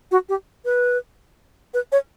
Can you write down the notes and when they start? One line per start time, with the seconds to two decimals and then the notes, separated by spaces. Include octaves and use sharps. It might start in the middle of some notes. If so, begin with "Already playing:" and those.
0.11 F#4
0.29 G4
0.65 B4
1.74 B4
1.92 C#5